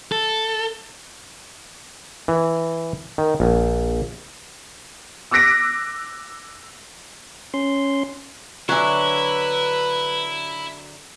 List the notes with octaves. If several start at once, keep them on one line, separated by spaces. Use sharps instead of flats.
A4
E3
D#3
A#1
D6 E6 F#6 A#6 B6 D7
C#4 C6
D3 F#3 E4 B4 C#5 E5 G#5